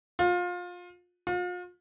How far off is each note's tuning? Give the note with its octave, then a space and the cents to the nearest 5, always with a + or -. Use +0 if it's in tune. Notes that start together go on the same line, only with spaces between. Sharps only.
F4 +25
F4 +40